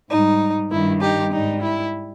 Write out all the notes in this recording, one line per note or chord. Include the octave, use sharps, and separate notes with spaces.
G#2 G3 D#4
G2 D#3 G3 E4
D#4 G4
G#2 G3 D#4
E4